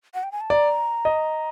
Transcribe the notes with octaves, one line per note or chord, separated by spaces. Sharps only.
F#5
G5
G#5
A5
D5 A#5
D#5